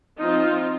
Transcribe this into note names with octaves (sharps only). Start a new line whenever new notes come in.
F3 C4 D#4 F4